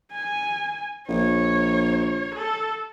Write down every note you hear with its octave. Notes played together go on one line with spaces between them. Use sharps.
G#5
A#1 C#5
A4